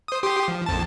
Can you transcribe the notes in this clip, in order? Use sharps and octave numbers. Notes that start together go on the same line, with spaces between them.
C5 D#6
G4 C6 D#6
F3
A#1 F2 A5